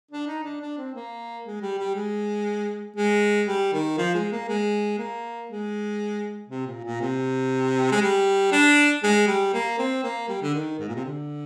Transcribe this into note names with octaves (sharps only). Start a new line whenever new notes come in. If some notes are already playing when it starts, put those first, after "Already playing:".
D4
D#4
D4
D4
C4
A#3
G#3
G3
G3
G#3
G#3
G3
D#3
F3
G#3
A#3
G#3
A#3
G#3
C3
A#2
A#2
C3
G#3
G3
D4
G#3
G3
A#3
C4
A#3
G3
D3
D#3
G#2
A#2
C3
D3